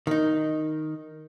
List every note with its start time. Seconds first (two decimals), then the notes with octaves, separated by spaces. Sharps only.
0.07 D#3 D#4